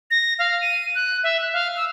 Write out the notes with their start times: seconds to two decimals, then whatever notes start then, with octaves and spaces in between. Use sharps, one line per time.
0.11 A#6
0.39 F5
0.61 D#7
0.95 F#6
1.23 E5
1.40 F#6
1.53 F5
1.77 E6